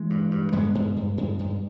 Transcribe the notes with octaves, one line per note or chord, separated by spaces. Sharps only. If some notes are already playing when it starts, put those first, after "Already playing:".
Already playing: E3 G#3
G2
G2
G2 G#3 B3
G2
G2
G2
G2